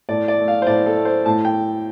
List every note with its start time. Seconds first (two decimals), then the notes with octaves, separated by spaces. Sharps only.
0.09 A2 D5
0.28 D5
0.38 A3
0.48 F5
0.62 C5
0.67 A2 D5
0.86 A4
0.96 A3
1.05 C5
1.26 A2 A5
1.45 G5